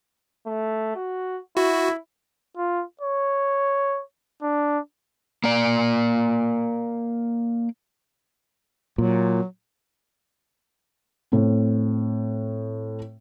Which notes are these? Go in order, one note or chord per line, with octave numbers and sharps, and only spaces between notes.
A3
F#4
E4 F#4
F4
C#5
D4
A#3 D5
A#2 F#3
A2 C4